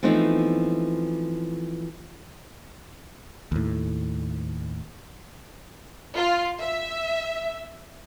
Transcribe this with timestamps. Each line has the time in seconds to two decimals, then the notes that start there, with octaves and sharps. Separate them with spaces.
0.03 E3 F3 A3 B3 C4 D#4
3.52 D#2 A2
6.15 F4
6.60 E5